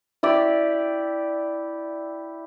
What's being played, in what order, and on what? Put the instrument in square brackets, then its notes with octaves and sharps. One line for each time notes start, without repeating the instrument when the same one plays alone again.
[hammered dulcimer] E4 G4 D5